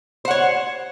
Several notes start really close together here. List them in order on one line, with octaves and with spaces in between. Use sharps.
C5 F#5 C#5